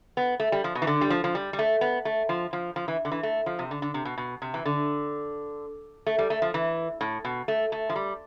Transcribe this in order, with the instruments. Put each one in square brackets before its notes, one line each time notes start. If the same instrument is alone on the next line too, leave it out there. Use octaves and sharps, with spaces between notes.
[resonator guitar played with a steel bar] B3
A3
G3
F3
B2
E3
D3
G3
F3
F3
G3
G3
A3
B3
A3
F3
F3
F3
E3
D3
E3
A3
F3
C3
D3
D3
C3
B2
B2
C3
E3
D3
A3
G3
A3
F3
E3
A2
B2
A3
A3
F3
G3